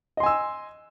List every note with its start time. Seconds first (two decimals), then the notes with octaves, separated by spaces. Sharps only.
0.17 D#5
0.20 C6
0.23 G#5
0.26 E6